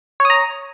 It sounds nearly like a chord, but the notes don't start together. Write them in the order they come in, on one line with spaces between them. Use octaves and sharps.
C#5 D#6 A#5